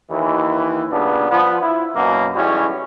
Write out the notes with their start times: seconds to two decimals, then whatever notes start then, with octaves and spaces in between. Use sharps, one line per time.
0.10 D#2 E3
0.91 G2 A#2 C#3 B3 D4
1.30 F3 B3
1.61 E4 F4
1.95 F#2 B2 A#3
2.35 B1 E2 G3 C#4 E4 F#4